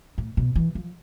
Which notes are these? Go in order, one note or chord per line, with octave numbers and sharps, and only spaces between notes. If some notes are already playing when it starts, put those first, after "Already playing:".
A2
B2
E3
F3